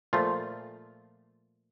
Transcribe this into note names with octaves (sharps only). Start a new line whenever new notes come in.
A#2 F3 A3 F4